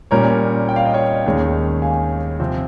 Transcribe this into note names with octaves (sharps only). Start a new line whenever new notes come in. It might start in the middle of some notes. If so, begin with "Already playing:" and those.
A#2 G3 C#4 A#4 C#5
G5
F5
D#5
C#5 F5
D#2 D#3 G#3 C#4
F5 G#5
C3 F3 C4